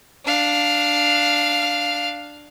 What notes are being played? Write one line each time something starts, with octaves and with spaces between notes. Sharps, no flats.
D4 F5